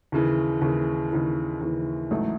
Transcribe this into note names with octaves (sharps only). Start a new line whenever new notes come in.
D#2 C#3 E3
D#2 C#3 E3
D#2 C#3 E3
D#2 C#3 E3
A1 G#2 F#3 A3 E4